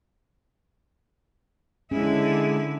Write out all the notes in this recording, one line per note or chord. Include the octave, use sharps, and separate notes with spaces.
D3 G#3 C#4 E4 G#4